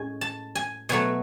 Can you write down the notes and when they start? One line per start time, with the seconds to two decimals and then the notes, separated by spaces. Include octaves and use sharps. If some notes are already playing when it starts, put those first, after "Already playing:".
Already playing: A2 G#3 C#4 G#5
0.21 A5
0.55 G#5
0.89 B2 F#3 A3 G#5